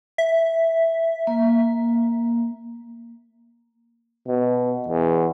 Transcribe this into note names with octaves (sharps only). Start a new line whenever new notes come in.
E5
A#3
B2
E2